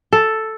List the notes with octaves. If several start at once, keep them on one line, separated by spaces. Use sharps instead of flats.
A4